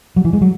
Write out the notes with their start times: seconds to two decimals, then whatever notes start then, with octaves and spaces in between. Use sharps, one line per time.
0.16 F#3
0.25 E3
0.33 G#3
0.41 F#3